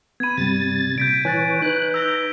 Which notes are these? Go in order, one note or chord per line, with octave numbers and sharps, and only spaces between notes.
B3 B5 G#6 D#7
G2 C3 G3 A6
A#2 G6 B6 D7
E3 C#5 G#5 F#6 A6
D#4 B4 F#6
A#5 E6 G6